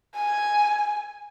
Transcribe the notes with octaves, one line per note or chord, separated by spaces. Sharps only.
G#5